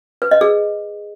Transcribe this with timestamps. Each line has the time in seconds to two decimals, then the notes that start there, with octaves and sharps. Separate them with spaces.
0.22 B4
0.31 D#5
0.41 G#4